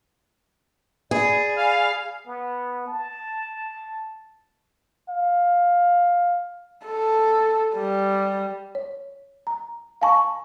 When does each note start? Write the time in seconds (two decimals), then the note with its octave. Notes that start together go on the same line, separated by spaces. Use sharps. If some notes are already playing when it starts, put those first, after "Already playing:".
1.11 G#4 D5 G#5 B5
1.57 F5
2.27 B3
2.87 A5
5.09 F5
6.86 A4
7.75 G3
8.75 C#5
9.47 A#5
10.02 F5 G#5 A5 B5 C#6